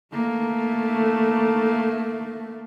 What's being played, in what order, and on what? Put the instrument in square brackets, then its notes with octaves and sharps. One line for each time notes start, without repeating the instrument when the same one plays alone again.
[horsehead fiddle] A3 A#3